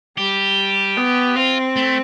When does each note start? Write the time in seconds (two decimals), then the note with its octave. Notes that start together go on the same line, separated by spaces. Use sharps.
0.18 G3 G4
0.97 B3
1.36 C4 F4
1.76 A3